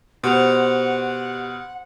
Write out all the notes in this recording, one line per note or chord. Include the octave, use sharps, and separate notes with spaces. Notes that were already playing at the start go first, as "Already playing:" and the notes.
B2 G4 C5 F#5 F7